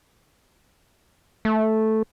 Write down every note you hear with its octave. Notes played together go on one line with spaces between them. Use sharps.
A3